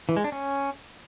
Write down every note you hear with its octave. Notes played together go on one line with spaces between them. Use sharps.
E3
G#3
D4
C#4